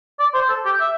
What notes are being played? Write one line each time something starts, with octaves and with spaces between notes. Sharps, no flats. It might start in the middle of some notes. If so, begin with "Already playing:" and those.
D5
C5
A4
G4
E5